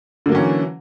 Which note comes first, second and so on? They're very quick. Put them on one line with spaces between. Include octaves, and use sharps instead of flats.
D3 A#3 F#3 C#4 E3